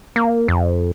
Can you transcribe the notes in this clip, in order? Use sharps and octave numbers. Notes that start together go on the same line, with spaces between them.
A#3
F2